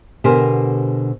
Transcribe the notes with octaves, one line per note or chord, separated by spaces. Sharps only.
B2 D3 G4 A#4 C5 G#5